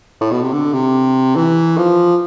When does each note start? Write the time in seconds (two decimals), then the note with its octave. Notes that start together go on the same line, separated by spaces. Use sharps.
0.21 A2
0.32 B2
0.42 C3
0.53 D3
0.73 C3
1.36 E3
1.78 F3